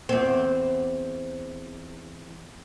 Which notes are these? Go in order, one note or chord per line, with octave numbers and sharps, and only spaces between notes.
E2 C4